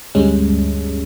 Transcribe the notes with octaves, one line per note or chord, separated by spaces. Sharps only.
D2 G2 G3 G#3 C#4